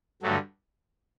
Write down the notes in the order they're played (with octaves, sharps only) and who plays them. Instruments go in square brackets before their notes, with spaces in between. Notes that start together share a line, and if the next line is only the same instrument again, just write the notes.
[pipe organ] G2 D3 F#3 A3